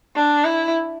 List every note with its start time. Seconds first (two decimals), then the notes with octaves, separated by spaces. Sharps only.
0.15 D4
0.45 E4